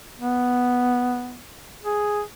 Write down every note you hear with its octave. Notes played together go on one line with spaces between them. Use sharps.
B3
G#4